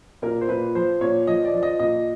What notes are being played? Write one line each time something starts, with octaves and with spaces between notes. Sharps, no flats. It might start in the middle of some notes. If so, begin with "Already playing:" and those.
A#2 A#4
C5
A#2 B4
F3 C5
A#2 C#5
F3 D#5
D5
F3
D#5
A#2 D#5